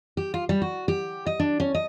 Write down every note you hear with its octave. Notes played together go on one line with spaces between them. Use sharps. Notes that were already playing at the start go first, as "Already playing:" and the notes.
G4
F4
G3
F#4
G4
D#5
D4
C#4
D#5